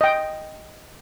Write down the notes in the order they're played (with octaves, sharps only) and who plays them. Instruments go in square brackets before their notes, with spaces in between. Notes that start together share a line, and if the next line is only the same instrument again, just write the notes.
[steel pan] D#5 G5